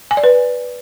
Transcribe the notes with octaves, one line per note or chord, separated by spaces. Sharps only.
G#5
D5
B4